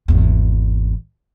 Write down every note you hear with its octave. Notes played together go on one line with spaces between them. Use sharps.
G#1 E2